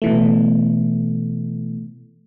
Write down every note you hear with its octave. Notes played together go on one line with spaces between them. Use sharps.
B2 E3 A3